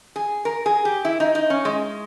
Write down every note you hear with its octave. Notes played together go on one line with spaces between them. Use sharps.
G#4
A#4
G#4
G4
E4
D#4
D#4
C#4
G#3